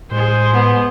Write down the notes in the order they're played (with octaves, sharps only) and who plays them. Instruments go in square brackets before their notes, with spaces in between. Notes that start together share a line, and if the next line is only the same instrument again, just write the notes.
[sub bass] A2 [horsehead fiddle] G#3 G#4 [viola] C5
[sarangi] B3